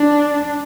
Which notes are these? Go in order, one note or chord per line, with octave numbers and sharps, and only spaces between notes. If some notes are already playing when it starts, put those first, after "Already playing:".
Already playing: D4